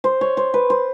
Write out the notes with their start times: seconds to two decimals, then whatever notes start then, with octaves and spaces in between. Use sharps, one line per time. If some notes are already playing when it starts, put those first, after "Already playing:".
0.04 C5
0.21 C#5
0.37 C5
0.54 B4
0.70 C5